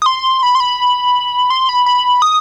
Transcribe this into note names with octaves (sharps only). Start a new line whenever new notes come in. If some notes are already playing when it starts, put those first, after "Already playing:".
D#6
C6
B5
C6
B5
C6
B5
B5
D#6